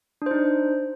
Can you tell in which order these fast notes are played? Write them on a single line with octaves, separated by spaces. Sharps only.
D4 C5 D#4